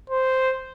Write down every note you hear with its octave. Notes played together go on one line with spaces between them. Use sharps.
C5